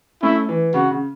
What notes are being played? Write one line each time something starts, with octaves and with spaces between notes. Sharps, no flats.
A3 C#4 E4
E3
C#3 F#4
C#3